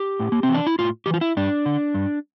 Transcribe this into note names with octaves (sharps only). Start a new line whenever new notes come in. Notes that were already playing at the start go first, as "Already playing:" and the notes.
Already playing: G4
A2
A#3
C4
E3
D4
E4
A2 F4
E3 G4
F4
E4
G2 D4
D3
G2